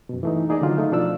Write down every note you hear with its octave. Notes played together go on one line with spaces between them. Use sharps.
F#2 B2
E3 A3 D#4
A#3 D#4 G#4 D5 D#5
D3 D#3 F#3 F4
A3 D#4
B2 F3 D4 F4 D5 E6